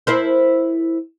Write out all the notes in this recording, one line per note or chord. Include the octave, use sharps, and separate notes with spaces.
E4 A#4 C5